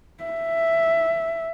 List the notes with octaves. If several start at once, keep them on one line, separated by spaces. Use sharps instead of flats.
E5